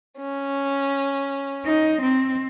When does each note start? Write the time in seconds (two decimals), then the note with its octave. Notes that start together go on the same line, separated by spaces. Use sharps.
0.18 C#4
1.65 D#4
2.01 C4